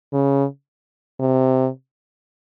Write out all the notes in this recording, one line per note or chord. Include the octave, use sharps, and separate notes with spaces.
C#3
C3